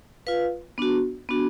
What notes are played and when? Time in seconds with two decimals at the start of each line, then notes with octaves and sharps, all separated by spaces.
0.27 F4 B4 F5
0.78 B3 D4 F#4
1.29 B3 D4 F#4